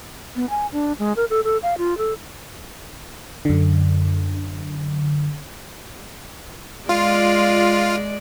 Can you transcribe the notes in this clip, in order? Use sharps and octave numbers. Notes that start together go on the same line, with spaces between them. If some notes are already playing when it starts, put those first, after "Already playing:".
B3
G#5
D4
G#3
A#4
A4
A4
F5
F4
A4
F#2 D3
G#3 F4 D5